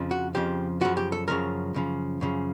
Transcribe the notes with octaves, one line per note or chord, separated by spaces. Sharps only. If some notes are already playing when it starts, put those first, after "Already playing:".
Already playing: F2 C#3 F3
F#4
F2 C#3 F3 G4
F#2 C#3 F3 F#4
G4
A4
F#2 C#3 F3 A#4
F#2 C#3 F3
F#2 C#3 F3